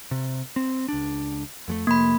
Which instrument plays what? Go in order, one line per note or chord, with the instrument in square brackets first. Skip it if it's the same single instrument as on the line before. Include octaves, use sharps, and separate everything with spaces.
[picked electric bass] C3
C4
C#2 D4
F2 G#3 A3
[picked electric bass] F1 [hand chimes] A#3 B5